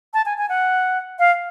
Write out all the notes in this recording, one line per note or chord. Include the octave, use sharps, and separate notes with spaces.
A5
G#5
G#5
F#5
F5